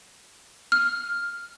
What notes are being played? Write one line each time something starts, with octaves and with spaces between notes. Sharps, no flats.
F6